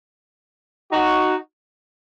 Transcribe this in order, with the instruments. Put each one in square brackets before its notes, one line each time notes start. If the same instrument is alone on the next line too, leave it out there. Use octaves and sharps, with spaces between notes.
[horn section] D#4 F#4